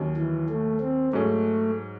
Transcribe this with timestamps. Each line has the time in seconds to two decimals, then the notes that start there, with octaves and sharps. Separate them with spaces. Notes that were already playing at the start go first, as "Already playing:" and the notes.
Already playing: D#2 D#3 F#3 C#4
0.17 E3
0.49 A3
0.81 C4
1.13 G#2 F#3 A3 C#4 G#4